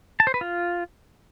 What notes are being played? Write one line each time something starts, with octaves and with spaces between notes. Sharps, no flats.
A5
C5
B4
F4